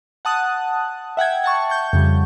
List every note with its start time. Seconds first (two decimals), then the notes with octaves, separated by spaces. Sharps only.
0.25 F#5 A5 D#6 F#6
1.17 E5 F#5 G5 G#6
1.44 F#5 A5 C#6
1.70 C#6 G6
1.93 F2 C#3 G3